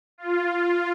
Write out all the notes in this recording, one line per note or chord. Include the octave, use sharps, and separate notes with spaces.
F4